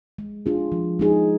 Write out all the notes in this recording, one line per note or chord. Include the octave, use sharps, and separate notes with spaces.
G#3
D4 F4 G#4
F3
G#3 D#4 G#4